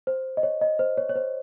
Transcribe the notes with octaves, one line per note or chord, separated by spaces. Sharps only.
C5
D#5
C#5
D#5
C5
C#5
C#5
C5